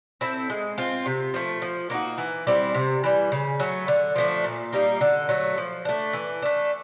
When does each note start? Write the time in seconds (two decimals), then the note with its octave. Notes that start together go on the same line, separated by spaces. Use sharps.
0.21 C4 E4 A4
0.50 G#3
0.78 C4 F4
1.06 C3
1.34 F3 A3
1.62 F3
1.90 A#3 D#4 F#4
2.18 E3
2.47 G3 C4 E4
2.74 C3
3.04 E3 G3
3.32 C#3
3.60 F#3 A3
3.88 D3
4.16 F3 A3 D4
4.44 A#2
4.73 G3 A#3 D#4
5.01 D3
5.29 F#3 A3
5.58 F3
5.85 A3 D4
6.13 E3
6.42 A3 D4